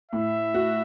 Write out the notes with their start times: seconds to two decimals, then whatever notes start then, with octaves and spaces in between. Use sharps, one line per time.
0.12 A2 E5
0.54 F#4